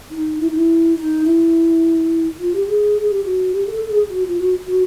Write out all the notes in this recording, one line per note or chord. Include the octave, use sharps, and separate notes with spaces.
D#4
E4
D#4
E4
D#4
E4
F4
G4
G#4
G#4
G4
F#4
G4
A4
A4
G#4
F#4
F4
F#4
F#4